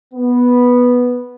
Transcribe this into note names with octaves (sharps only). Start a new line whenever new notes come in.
B3